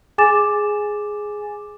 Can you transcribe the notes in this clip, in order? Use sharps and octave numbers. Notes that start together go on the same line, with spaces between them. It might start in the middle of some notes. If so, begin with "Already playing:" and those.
G#4 G#5 D6 A6 E7